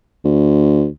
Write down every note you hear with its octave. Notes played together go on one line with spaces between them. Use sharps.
D2